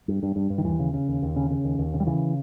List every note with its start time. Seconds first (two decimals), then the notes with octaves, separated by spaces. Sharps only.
0.08 G2
0.23 G2
0.36 G2
0.50 G2
0.58 D#3
0.64 D#2 E3
0.79 C#3
0.94 C#3
1.08 D#2
1.22 D#2
1.36 C#3
1.50 C#3
1.65 D#2
1.79 D#2
1.94 C#3
2.00 G3
2.07 C#3 E3